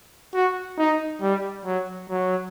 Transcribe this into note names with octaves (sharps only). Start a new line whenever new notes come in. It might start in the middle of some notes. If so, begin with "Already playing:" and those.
F#4
D#4
G3
F#3
F#3